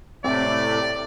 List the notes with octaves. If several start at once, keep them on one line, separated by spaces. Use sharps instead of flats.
A2 C3 A3 C4 D5